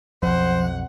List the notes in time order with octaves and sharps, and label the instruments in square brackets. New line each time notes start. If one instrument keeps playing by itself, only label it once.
[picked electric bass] B1 F2 [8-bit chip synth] F3 [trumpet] C5 [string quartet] F#5